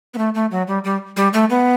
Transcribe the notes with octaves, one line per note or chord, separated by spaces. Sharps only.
B3
A3
A3
F#3
G3
G3
G3
A3
B3